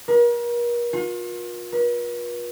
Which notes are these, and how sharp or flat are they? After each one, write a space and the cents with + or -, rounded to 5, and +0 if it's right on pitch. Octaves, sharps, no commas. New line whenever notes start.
A#4 +40
F4 +40
B4 -45